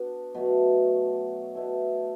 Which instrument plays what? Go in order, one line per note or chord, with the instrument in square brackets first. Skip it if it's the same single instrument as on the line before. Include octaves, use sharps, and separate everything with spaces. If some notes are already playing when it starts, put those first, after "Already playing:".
Already playing: [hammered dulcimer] B3 D4 F#4
B2 F#3 A3
B2 A3 E4 A4